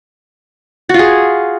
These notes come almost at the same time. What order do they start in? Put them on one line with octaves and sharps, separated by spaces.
F#4 F4 G#4